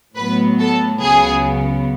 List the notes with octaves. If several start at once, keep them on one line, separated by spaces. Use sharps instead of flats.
A2 F#3 B3 B4
A4
C#2 C#3 F#3 B3 G#4